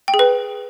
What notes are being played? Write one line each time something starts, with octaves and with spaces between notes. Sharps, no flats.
G5
G#4
B4